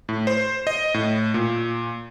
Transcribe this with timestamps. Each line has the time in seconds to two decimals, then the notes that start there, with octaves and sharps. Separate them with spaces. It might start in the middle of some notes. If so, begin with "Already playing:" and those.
0.09 A2
0.27 C5
0.67 D#5
0.94 A2
1.34 A#2